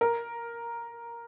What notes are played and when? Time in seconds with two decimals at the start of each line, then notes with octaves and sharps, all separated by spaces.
0.01 A#4